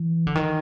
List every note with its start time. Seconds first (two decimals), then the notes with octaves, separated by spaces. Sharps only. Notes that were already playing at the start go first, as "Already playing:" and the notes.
Already playing: E3
0.27 D3
0.35 D#3